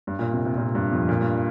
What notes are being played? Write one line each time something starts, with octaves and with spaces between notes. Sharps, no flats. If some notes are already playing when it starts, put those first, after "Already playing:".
G2
A#2
C3
C3
A#2
G2
F2
A#2
G2